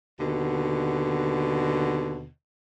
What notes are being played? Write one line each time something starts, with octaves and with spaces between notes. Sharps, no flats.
D#2 B2 D3